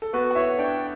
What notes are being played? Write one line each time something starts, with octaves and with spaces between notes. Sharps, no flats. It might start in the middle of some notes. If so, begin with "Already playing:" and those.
A4
B3 F#4 B4
F#5
E4 C#5 E5
D4 D5 G5